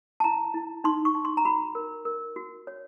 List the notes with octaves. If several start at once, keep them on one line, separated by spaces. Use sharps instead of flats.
A5
E4 A#5
E4
D#4 C6
C#6
D#4
C6
A#5
F#4 B5
A#4
A#4
F#4
C#5